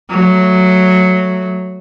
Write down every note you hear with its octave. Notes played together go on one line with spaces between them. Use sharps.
F#3 A3